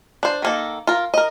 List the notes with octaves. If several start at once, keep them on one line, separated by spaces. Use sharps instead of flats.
D4 C5
D#3 A#3 A4
F4 A#4
A#4 D#5